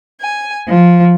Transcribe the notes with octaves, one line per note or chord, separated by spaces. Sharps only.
G#5
F3